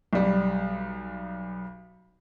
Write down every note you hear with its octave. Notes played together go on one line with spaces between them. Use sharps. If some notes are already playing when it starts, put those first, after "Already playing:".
B1 G3